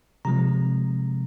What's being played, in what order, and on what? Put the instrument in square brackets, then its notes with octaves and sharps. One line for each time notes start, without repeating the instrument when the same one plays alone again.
[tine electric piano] C3 F3 G#3 A#5